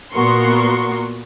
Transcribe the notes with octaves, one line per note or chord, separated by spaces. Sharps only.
A#2 B3 F#4 A#4 C6 C#6